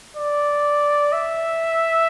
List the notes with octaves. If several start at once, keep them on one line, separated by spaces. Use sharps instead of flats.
D5
E5